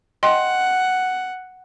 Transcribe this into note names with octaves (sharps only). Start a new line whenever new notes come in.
D#5 F#5 G5 C6